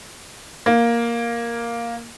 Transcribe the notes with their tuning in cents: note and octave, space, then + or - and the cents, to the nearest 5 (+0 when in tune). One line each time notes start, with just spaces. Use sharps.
A#3 +5